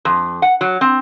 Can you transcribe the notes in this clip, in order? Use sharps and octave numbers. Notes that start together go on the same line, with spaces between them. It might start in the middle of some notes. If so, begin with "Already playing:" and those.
F2
F#5
F#3
C4